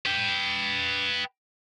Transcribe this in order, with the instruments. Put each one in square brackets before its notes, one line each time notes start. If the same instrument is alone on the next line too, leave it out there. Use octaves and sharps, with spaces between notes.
[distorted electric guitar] B4 G5